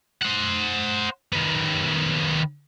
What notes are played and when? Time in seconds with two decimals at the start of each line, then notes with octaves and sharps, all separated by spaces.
0.23 C5 F#5
1.32 D#3 B3